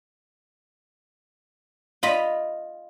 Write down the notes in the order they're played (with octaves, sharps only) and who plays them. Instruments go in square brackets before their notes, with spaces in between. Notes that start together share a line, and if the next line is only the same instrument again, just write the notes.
[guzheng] F4 D#5 B5